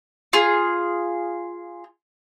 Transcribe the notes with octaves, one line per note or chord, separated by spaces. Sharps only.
F4 G#4